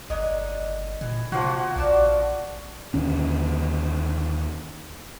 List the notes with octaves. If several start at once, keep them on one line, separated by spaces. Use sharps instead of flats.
G1 D3 F#3 D#5
A#2 E3
C3 F3 A#3 F#4 F5 F#5
A#1 D4 D5 A5
D#2 D3 C#4